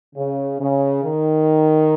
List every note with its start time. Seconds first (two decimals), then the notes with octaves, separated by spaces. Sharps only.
0.15 C#3
0.60 C#3
1.04 D#3